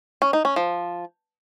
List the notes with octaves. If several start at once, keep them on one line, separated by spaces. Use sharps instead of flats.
C#4
D#4
C#4
F3